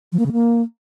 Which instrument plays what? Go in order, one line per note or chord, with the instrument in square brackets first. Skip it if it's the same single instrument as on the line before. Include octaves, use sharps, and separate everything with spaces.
[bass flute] F3
A#3
C#3
A#3